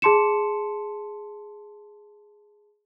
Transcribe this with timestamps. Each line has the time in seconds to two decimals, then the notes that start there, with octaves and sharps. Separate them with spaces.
0.02 G#4 A5 C6 C#7 E7